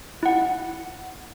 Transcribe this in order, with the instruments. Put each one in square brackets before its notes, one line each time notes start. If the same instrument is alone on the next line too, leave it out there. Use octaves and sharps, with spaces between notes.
[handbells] E4 F#5